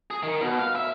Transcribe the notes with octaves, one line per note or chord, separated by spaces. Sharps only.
G#4
D#3
B2
F5
E5